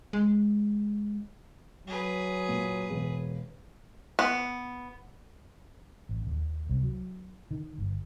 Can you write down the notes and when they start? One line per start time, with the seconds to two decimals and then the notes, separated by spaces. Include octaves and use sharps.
0.13 G#3
1.87 F#3 G#4 B4
2.49 A#2
2.89 E1
4.19 B3
6.09 A1
6.27 D#2
6.69 C2
6.83 F#3
7.51 D#3
7.78 G1